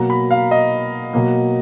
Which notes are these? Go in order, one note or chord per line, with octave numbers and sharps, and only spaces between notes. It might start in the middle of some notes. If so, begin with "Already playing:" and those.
Already playing: B2 F#3 A#3 A#5
B5
F5
D#5
B2 F#3 A#3